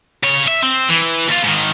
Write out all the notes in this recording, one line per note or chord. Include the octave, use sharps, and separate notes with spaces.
C#3 C#5
E5
C4
E3
D#2 F4
G#2 D#3